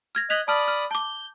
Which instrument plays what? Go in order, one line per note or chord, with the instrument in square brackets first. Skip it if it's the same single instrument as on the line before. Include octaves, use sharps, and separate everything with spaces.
[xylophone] F6 G#6 A#6
[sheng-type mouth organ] D#5 F#6 [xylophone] G#6 B6 F7
[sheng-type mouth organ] D5 B5 D#6 [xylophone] A5 F6
[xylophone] F6
[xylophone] A5 D6 [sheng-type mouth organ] G6